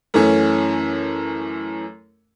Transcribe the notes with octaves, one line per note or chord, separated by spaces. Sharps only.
F#2 E3 A3 C#4